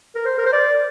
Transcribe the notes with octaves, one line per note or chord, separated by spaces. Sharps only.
A#4
C5
A#4
C5
D5